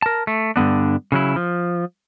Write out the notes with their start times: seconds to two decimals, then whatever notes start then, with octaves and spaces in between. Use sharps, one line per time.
0.02 A#4 A5
0.27 A3
0.56 G2 D3 B3 D4
1.12 C#3 F#3 E4
1.36 F3